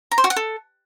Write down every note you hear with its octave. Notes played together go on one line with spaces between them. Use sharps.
A#5
C5
F#4
F#5
A4